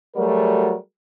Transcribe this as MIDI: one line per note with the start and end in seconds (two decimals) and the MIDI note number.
0.16 0.75 54
0.16 0.75 55
0.16 0.75 57
0.16 0.75 66
0.16 0.75 68
0.16 0.75 70